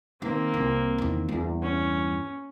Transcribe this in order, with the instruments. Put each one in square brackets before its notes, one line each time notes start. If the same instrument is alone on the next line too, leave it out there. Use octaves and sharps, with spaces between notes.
[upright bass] D#3 [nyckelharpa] A#3 C4
[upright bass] C2
E2 D#3
E2 G2
[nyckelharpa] C#4